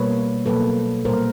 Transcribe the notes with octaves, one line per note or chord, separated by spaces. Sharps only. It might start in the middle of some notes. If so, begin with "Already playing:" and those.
Already playing: B2 G3 A#3 B4 C#5
B2 F#3 A#3 A4 B4
A#2 G3 A#3 A#4 C5